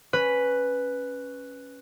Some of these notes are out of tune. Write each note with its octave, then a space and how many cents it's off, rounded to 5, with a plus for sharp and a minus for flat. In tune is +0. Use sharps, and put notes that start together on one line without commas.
C#4 +0 B4 +0